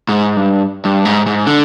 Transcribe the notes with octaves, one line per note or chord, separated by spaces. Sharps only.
G#2
G2
G2
G#2
G#2
D3